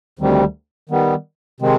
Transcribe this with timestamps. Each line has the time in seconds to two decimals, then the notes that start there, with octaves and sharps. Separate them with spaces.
0.19 D2 C3 D#3 G3
0.89 D#3 G3 B3
1.60 C3 D#3 G#3 C4